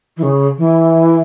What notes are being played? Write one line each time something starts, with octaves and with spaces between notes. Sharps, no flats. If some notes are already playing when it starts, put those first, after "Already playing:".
E3
C#3
E3